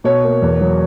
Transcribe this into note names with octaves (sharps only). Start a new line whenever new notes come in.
B2 C#5
A#3
E2
F#3